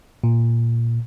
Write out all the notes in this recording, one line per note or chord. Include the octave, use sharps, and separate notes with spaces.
A#2